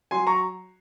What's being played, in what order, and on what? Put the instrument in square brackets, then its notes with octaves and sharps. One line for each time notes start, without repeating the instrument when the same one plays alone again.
[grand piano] F#3 G#5 C6
A#5 C#6